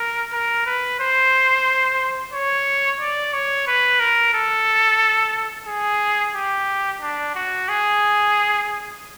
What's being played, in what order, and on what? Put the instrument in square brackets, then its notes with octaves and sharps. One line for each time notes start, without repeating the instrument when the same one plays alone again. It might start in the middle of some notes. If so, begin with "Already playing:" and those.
Already playing: [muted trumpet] A#4
A#4
B4
C5
C#5
D5
C#5
B4
A#4
A4
G#4
G4
D4
F#4
G#4